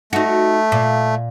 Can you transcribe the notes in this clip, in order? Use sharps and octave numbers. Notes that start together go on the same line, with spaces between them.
A3 D#4 F#4
A#2